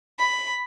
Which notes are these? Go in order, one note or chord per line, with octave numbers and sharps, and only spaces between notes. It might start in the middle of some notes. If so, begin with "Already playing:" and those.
B5